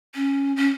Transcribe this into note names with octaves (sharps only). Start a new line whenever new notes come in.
C#4
C#4